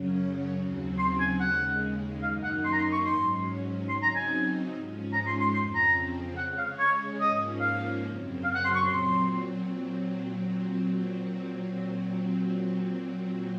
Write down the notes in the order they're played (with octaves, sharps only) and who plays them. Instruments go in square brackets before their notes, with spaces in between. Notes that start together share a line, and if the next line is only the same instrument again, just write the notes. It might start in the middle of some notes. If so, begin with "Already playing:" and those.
Already playing: [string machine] F#2 C#3 F#3 C#4
D#2 C#3 F#3 C4
[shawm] C6
G#5
[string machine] D#2 C#3 G#3 [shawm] F#5
[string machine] F#2 D#3 A#3 D#4 [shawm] F5
[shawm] F#5
C6
A#5
C6
C#6
[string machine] G#2 F#3 C#4 [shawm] C6
[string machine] C#3 F#3 C4 D#4 [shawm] C6
[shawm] A#5
G#5
[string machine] G#2 F3 G#3 C#4
[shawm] A#5
C6
C6
[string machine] F2 C#3 F3 C4 [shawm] C6
[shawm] A#5
[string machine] C#3 G#3 C#4 [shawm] F#5
[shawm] F5
C#5
[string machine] G#2 F3 A#3 C#4 [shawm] D#5
[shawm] F5
[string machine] F#2 C#3 F#3 C4
[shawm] F5
F#5
C6
C#6
[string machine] A#2 F#3 C4 [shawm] C6